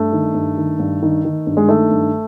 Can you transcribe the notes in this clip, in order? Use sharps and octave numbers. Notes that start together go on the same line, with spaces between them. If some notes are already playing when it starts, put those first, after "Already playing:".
Already playing: G2 A3
D#3
G2
D#3
G2
D#3
D#3
G2
G#3
D#3 A3
G2